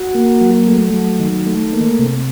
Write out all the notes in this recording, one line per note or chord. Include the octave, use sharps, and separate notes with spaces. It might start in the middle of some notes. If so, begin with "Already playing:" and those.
Already playing: F#4
A#3
F#3
A3
F#3
D#3
A3
A#3
C3